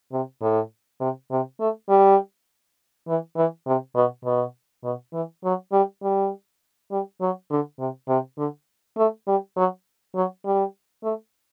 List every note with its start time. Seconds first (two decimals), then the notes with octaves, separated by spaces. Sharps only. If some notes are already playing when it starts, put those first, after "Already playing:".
0.12 C3
0.42 A2
1.00 C3
1.31 C3
1.60 A3
1.89 G3
3.08 E3
3.36 E3
3.66 C3
3.95 B2
4.25 B2
4.84 B2
5.13 E3
5.44 F#3
5.72 G3
6.03 G3
6.91 G3
7.21 F#3
7.50 D3
7.79 C3
8.08 C3
8.38 D3
8.97 A3
9.27 G3
9.57 F#3
10.15 F#3
10.45 G3
11.03 A3